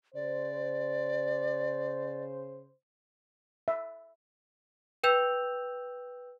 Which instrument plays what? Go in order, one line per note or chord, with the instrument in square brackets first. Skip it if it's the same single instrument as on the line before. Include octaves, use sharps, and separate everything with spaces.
[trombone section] C#3 C5 [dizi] D5
[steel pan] E5
[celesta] B4 G5 E6 G6 F7